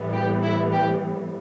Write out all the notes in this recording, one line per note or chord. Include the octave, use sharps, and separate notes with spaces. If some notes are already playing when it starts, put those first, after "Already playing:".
Already playing: A2 E3 G3 B3
G4
E4
G4